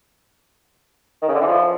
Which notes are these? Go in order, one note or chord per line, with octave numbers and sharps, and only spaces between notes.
D#3
C#3
D3
E3
F3